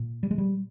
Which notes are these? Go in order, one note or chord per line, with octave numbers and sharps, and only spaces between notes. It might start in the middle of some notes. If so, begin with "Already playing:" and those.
Already playing: A#2
G3
G#3
G3